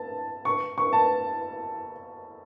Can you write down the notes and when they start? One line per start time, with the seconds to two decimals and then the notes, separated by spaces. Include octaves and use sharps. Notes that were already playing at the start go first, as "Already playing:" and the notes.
Already playing: A5
0.45 C#6
0.78 C#6
0.93 A5